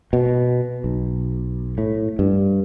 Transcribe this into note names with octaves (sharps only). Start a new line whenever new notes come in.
B2
B1
A2
G2